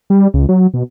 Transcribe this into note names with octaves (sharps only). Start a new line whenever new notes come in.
G3
C#2
F#3
B2